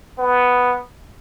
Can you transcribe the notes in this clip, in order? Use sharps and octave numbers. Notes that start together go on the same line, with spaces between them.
B3